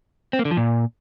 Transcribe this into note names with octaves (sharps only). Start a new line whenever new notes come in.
C4
A#3
D3
F3
A#2